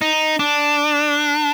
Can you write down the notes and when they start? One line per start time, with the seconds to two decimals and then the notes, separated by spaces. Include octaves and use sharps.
0.02 D#4
0.39 D4